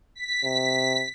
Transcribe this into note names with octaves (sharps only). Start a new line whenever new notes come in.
B6
C3